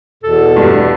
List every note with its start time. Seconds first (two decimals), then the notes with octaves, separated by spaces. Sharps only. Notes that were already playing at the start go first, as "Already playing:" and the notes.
0.23 E2 B2 A4
0.56 G2